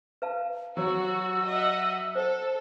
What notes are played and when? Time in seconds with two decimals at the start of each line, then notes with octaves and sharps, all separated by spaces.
0.22 B4 F5 A5
0.77 F#3 F#4 G4 C#5 E6
1.47 D#5 E5 F#5
2.15 A4 C5